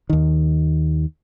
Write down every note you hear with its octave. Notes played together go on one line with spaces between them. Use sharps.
D#2 D#3